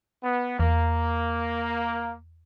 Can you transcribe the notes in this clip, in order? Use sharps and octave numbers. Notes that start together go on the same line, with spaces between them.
B3
E2 A#3